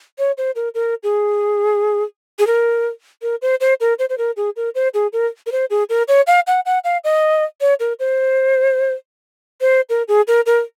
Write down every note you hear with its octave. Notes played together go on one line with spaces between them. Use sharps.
C#5
C5
A#4
A#4
G#4
G#4
A#4
A#4
C5
C5
A#4
C5
C5
A#4
G#4
A#4
C5
G#4
A#4
A#4
C5
G#4
A#4
C#5
F5
F#5
F#5
F5
D#5
C#5
A#4
C5
C5
A#4
G#4
A#4
A#4